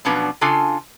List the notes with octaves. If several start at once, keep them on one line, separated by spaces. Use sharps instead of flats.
B2 F3 F#3 C#4 D4 B4
C#3 D4 F4 A4 G#5